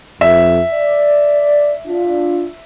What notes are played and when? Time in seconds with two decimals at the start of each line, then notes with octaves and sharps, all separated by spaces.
0.21 F2 E5
0.72 D5
1.87 D4 F4